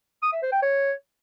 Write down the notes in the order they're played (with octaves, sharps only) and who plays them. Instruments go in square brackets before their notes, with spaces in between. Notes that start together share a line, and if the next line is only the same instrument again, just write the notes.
[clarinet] D#6
E5
C5
G5
C#5